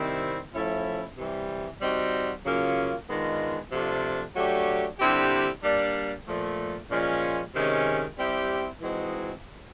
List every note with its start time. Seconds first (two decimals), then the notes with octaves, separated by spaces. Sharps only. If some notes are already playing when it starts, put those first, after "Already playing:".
Already playing: C3 D#3 G3 C4 E4
0.53 F3 A3 C#4 E4
1.16 C3 E3 G3
1.81 G3 C4 D#4 F#4
2.45 C#3 F#3 A#3 C#4 F4
3.08 D#3 G#3 B3 D4 F4
3.71 C3 F3 A3 D4 F4
4.35 F#3 A3 D4 G4
4.99 D3 G3 C4 E4 G4
5.62 G3 A#3 D4
6.27 A#2 F3 A3
6.90 A#2 F3 G#3 C#4
7.54 C3 D#3 G#3 C#4
8.17 G3 C4 E4 G4
8.81 E3 G#3 C4 D#4 F#4